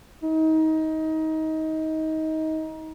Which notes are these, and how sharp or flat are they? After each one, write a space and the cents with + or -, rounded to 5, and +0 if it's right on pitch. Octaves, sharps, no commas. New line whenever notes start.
D#4 +25